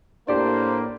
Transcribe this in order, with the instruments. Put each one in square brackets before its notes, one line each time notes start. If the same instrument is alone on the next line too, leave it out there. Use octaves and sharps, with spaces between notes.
[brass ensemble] A2 A#3 [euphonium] D4 [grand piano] G4 D5 [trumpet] C5